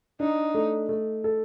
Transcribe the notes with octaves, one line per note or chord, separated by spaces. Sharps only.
D4 D#4
A3
A3
A4